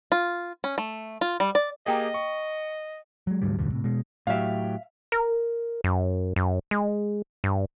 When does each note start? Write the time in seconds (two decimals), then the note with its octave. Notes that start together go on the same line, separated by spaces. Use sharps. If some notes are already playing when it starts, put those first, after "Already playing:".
0.12 F4
0.64 C#4
0.78 A3
1.21 F4
1.40 G3
1.55 D5
1.86 A#3 G4 G#4 D#5 F5 G5 A#5
2.14 C#6
3.27 F#3 G#3
3.42 D2 G#2 F#3 G3
3.59 E1 A1 D2 G2
3.72 A2 C3
3.84 B2 G#3
4.27 A2 F#3 G4 E5 F5
5.12 A#4
5.84 F#2
6.36 F#2
6.71 G#3
7.44 G2